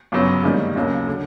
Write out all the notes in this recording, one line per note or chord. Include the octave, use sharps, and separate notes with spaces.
G1 F#2 C#3 F#3 B3
G#2 D#3 G3 A#3
D#2 C#3 F#3 A#3
D3